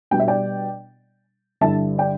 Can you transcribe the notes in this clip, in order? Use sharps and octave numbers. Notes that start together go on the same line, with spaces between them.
B2 G3 D4 G5
E5
D5 G5
G2 D3 G3 E4 E5 A5
D5 G5